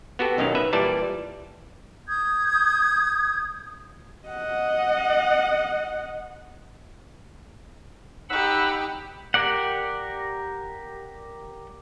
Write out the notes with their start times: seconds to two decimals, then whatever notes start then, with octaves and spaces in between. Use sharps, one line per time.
0.19 B3 F#4 G4 A4
0.38 B1 F#2 D#3 C#4 F5
0.55 B4 E5
0.73 A#2 E3 G3 D5 A5
2.08 D#6 G6 G#6
4.28 D#5 F#5
8.29 D#4 G4 F#5 B5 E6
9.34 G4 A#4 D5 F#5